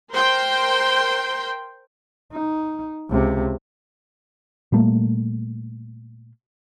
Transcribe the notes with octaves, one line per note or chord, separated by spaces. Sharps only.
A#4 C5 G5 C6
D#4
C#2 C3
A#2 G3 A3 A#3